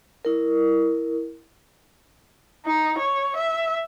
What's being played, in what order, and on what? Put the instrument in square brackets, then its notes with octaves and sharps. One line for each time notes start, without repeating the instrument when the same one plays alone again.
[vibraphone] E4 A#4
[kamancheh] D#4
C#5
E5